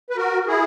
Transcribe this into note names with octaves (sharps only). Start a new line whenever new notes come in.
B4
F#4 A#4
E4 G#4